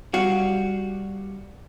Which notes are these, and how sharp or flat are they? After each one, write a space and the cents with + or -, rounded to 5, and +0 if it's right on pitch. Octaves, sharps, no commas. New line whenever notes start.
G3 +0 F#4 +0 F5 +0